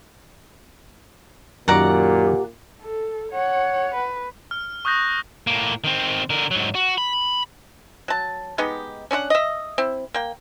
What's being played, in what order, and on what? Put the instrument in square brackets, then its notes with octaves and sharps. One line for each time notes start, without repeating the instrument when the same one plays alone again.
[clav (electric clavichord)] F#2 D#3 [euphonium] A#2 [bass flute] G4 [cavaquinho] D5 F#5 A#5
[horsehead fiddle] A4
C#5 F#5
B4
[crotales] F6
C#6 D#6 F#6 G6 A#6
[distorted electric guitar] A2 A#3
D#3 C4
D3 A#4
G#2 F#3
F#4
B5
[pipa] F#3 A5
G#3 B3 D#4 G4
C#4 D4 A4 F#5
D#5 E5
C4 E4
A#3 G5